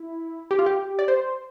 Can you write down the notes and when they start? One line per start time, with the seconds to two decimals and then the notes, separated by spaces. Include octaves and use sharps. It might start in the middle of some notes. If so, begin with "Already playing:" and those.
Already playing: E4
0.51 G4
0.59 F4
0.66 G4
0.99 D5
1.08 C5